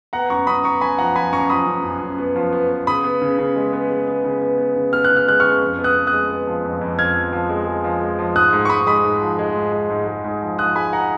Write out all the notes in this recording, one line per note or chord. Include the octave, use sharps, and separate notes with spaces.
B3 F#5 A#5
F#2 A#5 C#6
F#2 B5 D#6
B3 A#5 C#6
F#2 G#5 B5
F3 F#5 A#5
F3 G#5 B5
F#2 A#5 C#6
F3 B5 D#6
F#2
F#2
F#2
B3
F3
B3
B3
C#3 B5 D#6
B3
C#3
C#3
G#3
B3
G#3
B3
C#3
B3
B3
C#3
B3 F6
F#6
C#3
F6
G#3 F#6
C#3 C#6 F6
F2
B3
D#6 F#6
B3
D#6 F#6
G#3
B3
F3
F2
F2
F2 F6 G#6
F3
F3
G#3
G#3
F3
G#3
F3
G#2 D#6 F#6
G#2
C#6
G#2 B5 D#6
G#3 B5 D#6
G#2
F3
G#3
G#2
G#3
G#2
G#3
G#2
F3
F3 D#6 F#6
G#3 G#5 B5
F#5 A#5